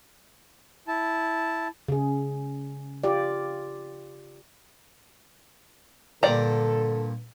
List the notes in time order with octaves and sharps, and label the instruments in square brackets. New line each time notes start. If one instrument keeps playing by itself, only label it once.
[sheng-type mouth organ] E4 A5
[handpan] C#3 G#4
F4 G4 D5
[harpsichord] G2 A#2 [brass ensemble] D3 A4 [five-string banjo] D5 A#5